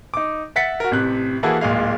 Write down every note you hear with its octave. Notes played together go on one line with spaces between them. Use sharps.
D#4 D6
E5 F#5 A6 B6 C#7
F#4 A#4
A1 C3 F#6
E3 A#3 E4 F#4 G#4 A4
D1 A#2 G#3 F5